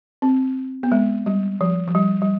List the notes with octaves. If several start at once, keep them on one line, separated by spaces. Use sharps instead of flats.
C4
B3
G#3
G3
F3
F3
G3
G3